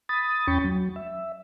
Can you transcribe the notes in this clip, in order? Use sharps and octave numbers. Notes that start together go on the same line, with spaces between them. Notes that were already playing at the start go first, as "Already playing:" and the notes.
B5 D#6 A6
E2 C#4 G5 B5 C#6 A6
F#3
E5